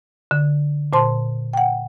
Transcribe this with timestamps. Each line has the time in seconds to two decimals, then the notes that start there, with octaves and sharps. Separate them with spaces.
0.31 D3
0.93 A#2 C5 A5 C6
1.53 F#5 G5